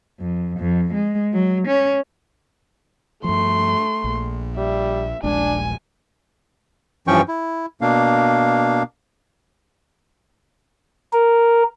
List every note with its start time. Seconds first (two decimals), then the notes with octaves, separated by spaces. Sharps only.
0.20 F2
0.59 F2
0.94 G#3
1.33 F#3
1.67 C#4
3.24 G2 F3 A3 C6
4.04 A#1
4.57 G3 E5
5.24 D#1 A#1 G#3 D4 G#5
7.08 G2 E3 F3 C#4 G5 C#6
7.28 E4
7.81 B2 A#3 D4 F5
11.13 A#4